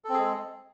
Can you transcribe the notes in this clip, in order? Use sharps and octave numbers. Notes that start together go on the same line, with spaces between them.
G#3 C4 G#4 A4